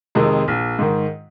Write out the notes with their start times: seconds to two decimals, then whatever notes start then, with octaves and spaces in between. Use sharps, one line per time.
0.15 F2 C3 D#3 G#3
0.48 A#1
0.79 G#2 D#3